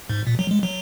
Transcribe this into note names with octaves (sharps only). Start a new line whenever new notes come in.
G#2
A#2
F#3
G#3
F#3